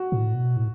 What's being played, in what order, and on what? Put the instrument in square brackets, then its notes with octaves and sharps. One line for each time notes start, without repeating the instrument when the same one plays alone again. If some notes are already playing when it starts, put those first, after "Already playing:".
Already playing: [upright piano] F#4
[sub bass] A2
B2
A2